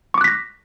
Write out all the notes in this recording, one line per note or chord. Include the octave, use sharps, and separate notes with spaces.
C#6 D6 F#6 A#6 B6